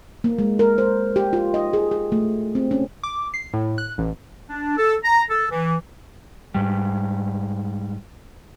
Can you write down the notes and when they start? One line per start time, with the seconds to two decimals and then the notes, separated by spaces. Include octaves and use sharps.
0.24 A#3
0.39 G#3
0.59 A#4
0.78 C5
1.16 G4
1.33 F4
1.54 D#5
1.73 G#4
1.91 G#4
2.12 A3
2.55 C4
2.71 C#4
3.03 D6
3.34 C7
3.53 A2
3.78 F#6
3.98 A1
4.48 D4
4.77 A4
5.03 A#5
5.29 A4
5.51 E3
6.55 G#2 G3